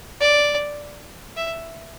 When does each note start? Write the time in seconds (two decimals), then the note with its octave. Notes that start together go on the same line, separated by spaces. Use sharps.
0.21 D5
1.37 E5